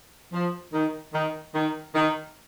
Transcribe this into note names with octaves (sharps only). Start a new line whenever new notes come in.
F3
D#3
D#3
D#3
D#3